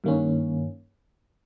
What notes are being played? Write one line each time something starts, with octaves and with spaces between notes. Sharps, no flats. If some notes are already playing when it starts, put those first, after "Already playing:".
G2 D#3 A#3 C#4